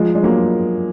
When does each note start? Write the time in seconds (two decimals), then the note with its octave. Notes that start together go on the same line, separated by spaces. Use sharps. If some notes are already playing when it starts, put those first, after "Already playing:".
Already playing: F3 G#3
0.15 G#3
0.23 F#3 A#3